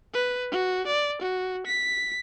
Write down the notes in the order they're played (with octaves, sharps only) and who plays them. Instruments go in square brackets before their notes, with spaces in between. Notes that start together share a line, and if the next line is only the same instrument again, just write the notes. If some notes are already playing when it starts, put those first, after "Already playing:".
[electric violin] B4
F#4
D5
F#4
B6